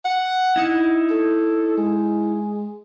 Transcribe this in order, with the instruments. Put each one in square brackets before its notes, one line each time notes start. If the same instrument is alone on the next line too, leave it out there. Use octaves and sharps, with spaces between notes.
[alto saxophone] F#5
[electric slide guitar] D#4 E4
[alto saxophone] A4
G#3